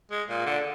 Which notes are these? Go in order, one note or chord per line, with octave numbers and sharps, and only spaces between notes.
G#3
A#2
D3